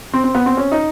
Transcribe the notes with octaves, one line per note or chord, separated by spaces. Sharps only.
C4
C4
B3
C4
C#4
D#4